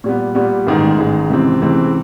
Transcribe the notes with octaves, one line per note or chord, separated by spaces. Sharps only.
A#2 G3 B3
A#2 G3 B3
A1 G#2 D#3 G#3
A1 G#2 D#3 G#3
C#2 C3 E3 G#3 C4
C#2 C3 E3 G#3 C4